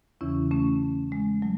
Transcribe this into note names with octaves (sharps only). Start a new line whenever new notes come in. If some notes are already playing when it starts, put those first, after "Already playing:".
E2 C#3 E3 C#4 E4
A3 C#4
G#3
F#3 A3